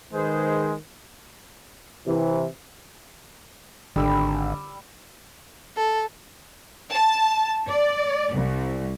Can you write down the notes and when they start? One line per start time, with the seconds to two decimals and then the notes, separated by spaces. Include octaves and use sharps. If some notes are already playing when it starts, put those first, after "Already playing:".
0.13 D#3 G#3 G#4 B4 C5
2.07 C3 E3
3.96 G#1 D3 G3 E6
5.77 A4
6.92 A5
7.69 D5
8.34 C2